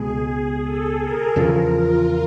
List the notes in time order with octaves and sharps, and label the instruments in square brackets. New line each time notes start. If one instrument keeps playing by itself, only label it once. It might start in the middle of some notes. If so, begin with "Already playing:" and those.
Already playing: [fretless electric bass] C#2 B2 G#3 [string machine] G#4
[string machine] G#4
A4
A#4
[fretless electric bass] E2 C#3 F3 [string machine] A#4
[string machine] F4